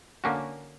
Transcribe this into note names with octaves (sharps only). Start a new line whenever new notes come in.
D3 A#3 C#4 F#4